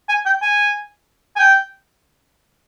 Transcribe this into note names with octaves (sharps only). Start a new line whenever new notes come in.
G#5
G5
G#5
G#5
G5